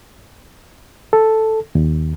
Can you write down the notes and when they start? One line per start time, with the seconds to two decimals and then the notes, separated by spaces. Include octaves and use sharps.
1.13 A4
1.75 D#2